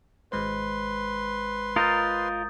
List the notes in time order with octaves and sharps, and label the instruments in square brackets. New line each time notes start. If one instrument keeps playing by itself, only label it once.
[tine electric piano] G#1 G#3 C5 [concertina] B4 C6
[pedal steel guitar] F4 A#4 D#5 [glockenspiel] D#6 G6 A6